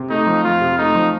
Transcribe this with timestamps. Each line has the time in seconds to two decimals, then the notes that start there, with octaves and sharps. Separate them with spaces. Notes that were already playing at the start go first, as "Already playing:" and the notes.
Already playing: C3
0.10 A3 D#4
0.27 F3
0.44 F2 F4
0.61 C3
0.78 A3 D#4
0.95 F3